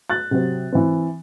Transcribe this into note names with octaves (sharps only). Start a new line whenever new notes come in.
F#6 A6
C3 F#3 C4
E3 C4